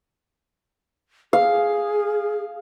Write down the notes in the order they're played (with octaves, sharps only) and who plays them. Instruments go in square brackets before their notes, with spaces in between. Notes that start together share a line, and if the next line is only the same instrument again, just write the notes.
[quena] G#4 [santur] F5